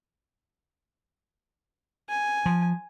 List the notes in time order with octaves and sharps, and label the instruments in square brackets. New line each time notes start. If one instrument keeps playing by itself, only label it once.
[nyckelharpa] G#5
[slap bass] F3